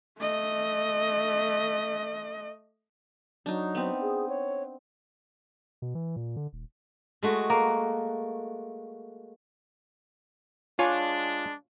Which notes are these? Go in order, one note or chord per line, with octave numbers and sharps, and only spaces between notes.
A3 D#5
F#3 D4 D#4
B3 C4
G#4
C#5
B2
E3
A#2
D3
D#1
G#3 A3 F#4
A#3
G#3 D4 F4 C#5 G#5